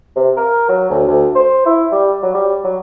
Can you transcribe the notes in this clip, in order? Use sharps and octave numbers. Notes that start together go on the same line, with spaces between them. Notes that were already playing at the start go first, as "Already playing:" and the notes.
C3
A#4
F#3
D2
D2
C5
E4
G3
F#3
G3
F#3